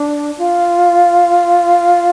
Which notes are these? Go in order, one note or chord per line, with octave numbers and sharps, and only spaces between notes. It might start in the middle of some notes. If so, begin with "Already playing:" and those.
Already playing: D4
F4